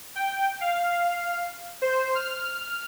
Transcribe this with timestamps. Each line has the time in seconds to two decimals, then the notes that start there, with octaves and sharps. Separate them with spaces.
0.15 G5
0.61 F5
1.82 C5
2.15 F6